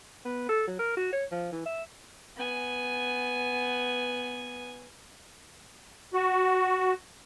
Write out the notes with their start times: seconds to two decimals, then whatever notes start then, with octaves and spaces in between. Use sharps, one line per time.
0.25 B3
0.49 A4
0.67 F#3
0.79 A#4
0.97 F#4
1.12 C#5
1.31 F3
1.52 E3
1.66 E5
2.36 B3 G#5
6.14 F#4